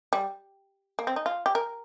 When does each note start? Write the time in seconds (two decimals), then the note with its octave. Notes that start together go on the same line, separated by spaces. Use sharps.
0.13 G3
0.99 A#3
1.07 C4
1.16 D#4
1.26 F4
1.46 G4
1.55 A#4